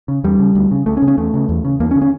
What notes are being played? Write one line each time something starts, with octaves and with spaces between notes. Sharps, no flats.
C#3
E2 G3
C#3
D2
C#3
D2 A3
C#4
C#3
C#4
E2 A3
C#3
E2
C#3
E2 A#3
C#4
D3
C#4